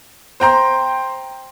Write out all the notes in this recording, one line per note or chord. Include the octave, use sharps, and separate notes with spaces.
C5 G5 A#5 C6